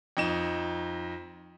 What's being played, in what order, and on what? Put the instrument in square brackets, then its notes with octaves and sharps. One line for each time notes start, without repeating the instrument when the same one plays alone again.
[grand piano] F2 D#4 E7